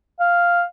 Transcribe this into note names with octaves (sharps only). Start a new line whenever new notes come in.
F5